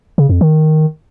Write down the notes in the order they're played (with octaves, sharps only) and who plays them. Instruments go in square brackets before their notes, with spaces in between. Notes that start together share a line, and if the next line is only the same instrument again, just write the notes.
[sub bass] C#3
F2
D#3